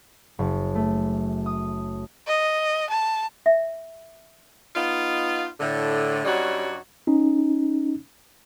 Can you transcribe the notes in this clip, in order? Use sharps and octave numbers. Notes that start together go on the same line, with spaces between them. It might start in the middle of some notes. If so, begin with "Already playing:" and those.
F#1
A3
D#6
D#5
A5
E5
B3 D#4 F4
A2 D3
G2 F#3 G3 C#4 D#4 F#4
C#4 D#4